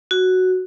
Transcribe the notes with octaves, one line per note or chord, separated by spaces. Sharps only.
F#4